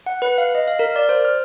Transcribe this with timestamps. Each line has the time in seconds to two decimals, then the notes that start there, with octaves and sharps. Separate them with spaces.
0.06 F#5
0.22 B4
0.38 F5
0.55 D#5
0.68 F5
0.79 A#4
0.96 D5
1.09 C5
1.25 F6